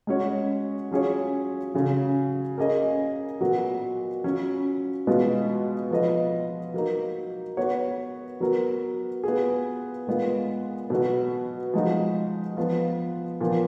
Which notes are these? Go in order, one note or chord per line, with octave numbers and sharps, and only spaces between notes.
G#3 C#4 F#4 C#5
F#3 C#4 F4 G#4 C#5
C#3 F#3 C#4 G#4
A#3 C#4 G#4 D#5
A#2 F#3 B3 F#4
F#3 C#4 F4
B2 G#3 B3 F4
F3 B3 F4 B4 D#5
F#3 A#3 D#4
B3 F#4 C#5
F#3 B3 F#4 A#4
B3 F4 G#4
A#2 G#3 B3 F4
B2 F#3 B3 F#4
F3 G#3 D#4 F#4
F3 B3 F4
A#2 F3 B3